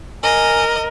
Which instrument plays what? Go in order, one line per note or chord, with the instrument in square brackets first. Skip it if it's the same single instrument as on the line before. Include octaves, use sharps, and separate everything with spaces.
[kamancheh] A#4 [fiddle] D#5 [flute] G#5